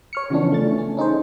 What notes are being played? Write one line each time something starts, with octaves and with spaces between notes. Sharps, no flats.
C#5 F6 C#7
C#3 E3 F3 B3 C#4 D4
A3 A6
C#4
C#4 D#4 G#4 C5